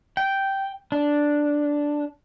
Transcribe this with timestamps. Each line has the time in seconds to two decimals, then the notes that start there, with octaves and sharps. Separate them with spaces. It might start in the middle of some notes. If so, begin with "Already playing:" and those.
0.17 G5
0.92 D4